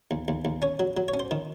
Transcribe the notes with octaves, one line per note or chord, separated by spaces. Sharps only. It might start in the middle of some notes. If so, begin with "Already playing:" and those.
D#2
D#2
D#2
C#4 C#5
F#3
F#3
C#5
C#4
C5
D#3